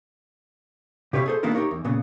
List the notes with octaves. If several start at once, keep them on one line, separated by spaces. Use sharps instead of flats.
C3 G4 B4 C#5 E5 F5
G#4 A4 C5
D#3 A#3 B3 D4 E4 A#4
D#4 G4 A#4 C#5
E2
A#2 C#3 B3